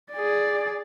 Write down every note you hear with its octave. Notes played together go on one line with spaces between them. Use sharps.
G#4 D5